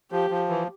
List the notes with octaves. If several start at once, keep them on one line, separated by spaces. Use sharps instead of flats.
F3 G4
F3
E3